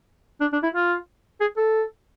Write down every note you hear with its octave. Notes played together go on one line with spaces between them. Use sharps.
D4
D4
E4
F4
G#4
A4